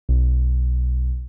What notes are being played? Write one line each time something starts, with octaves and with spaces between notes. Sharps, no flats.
B1